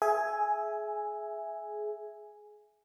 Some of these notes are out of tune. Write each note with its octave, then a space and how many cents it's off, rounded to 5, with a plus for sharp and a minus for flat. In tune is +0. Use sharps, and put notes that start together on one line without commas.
G#4 +25 E5 +0 G#5 +0